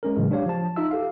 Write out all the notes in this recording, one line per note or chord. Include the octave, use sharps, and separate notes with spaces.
G#3 C#4 A#4
A2 C#3 E3 F#3 G#3
D4 G4 C#5 F5
F3 A5
D#4 F4 E5 E6
G4 A4 F5